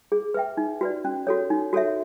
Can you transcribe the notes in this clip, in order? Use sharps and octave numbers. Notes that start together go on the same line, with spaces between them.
G#4
B4 E5 G5
D#4
F#4 B4 D5
C#4
F#4 A4 C#5
D#4
F#4 A4 C#5 E5